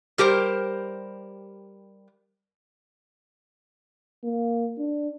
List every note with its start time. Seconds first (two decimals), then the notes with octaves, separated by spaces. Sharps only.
0.18 G3 G4 A#4 C5
4.24 A#3
4.78 D4